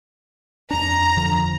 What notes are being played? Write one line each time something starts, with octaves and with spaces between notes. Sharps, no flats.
F2 D4 A#5
F2 D3 F3